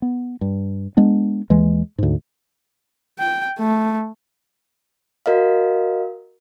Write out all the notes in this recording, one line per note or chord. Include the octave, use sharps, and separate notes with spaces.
B3
G2
G#3 B3 D4
D#2 E3 G#3
D2 G#2
G5
A3
F#4 A#4 D#5 F5